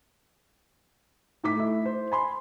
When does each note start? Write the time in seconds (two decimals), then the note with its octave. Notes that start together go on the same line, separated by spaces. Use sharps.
1.44 A2 D#4 D6 B6
1.55 A3 E4
1.85 C5
2.12 G#5 B5 C6